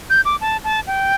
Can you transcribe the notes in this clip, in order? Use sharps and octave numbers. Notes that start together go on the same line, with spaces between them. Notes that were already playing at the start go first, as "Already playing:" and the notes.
G6
D6
A5
A5
G5